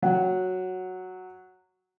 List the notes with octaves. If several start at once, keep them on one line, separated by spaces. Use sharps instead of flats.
F#3 F#5